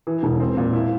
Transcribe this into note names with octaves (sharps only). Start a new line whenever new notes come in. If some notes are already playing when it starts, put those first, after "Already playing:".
E3
E1
C4
A#2
E4